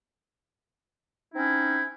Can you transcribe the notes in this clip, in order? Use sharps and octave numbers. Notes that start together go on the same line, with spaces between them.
C4 C#4 D#4 E4